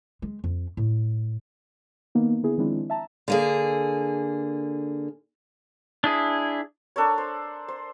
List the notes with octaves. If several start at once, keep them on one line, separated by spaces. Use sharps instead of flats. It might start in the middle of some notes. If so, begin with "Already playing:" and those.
G#3
F2
A2
D#3 A#3 B3 D#4
D3 B3 E4 G#4
D#3 F3 G#3 C4 D4 E4
E5 A5 A#5
D3 A#3 G#4
D4 E4 G#4
D4 A4 A#4 C#5
C5
C5